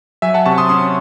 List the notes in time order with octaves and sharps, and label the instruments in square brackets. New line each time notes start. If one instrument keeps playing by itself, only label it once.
[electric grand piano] F#3 E5 G#5
F#5 A5
C3 A5 C#6
C6 D#6
C#4 C6 D#6